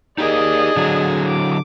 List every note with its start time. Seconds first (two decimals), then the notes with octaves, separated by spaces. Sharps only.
0.18 D#4 G4 G#4 A#4 D5 D#5
0.77 D3 F#3
1.27 D6